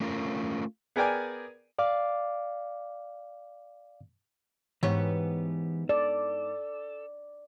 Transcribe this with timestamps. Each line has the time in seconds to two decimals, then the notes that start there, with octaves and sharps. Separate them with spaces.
0.01 A3 C#4 F4 A#4
0.96 B3 G#4 A#4 D5 G5 G#5
1.79 D5 F5 D6
4.83 G#2 E3 B3 G4 C#5
5.89 A4 D5